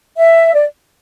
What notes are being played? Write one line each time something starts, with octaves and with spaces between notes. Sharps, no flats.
E5
D5